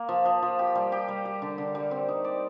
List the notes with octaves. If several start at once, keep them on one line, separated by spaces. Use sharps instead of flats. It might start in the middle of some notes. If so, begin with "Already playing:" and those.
Already playing: A#3
F3
F3
F3
G4
G3
G4
G3
G4
D3
D3
G3
C4
D#4
D5